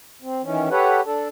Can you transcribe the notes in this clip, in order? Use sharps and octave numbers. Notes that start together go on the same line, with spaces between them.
C4
D#3 E3 C#4
G4 A4 B4 C#5 F#5
D4 A4